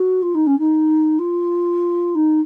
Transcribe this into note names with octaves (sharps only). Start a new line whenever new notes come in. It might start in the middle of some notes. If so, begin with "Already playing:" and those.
Already playing: F#4
F4
D#4
C#4
D#4
F4
D#4